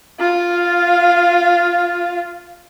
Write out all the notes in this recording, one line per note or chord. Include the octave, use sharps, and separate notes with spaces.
F4 F5